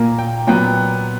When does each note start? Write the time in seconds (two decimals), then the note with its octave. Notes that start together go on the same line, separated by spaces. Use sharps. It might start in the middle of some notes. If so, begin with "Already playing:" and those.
Already playing: A#2 A#3 A#5
0.19 G5
0.47 A#2 F#3 B3 G5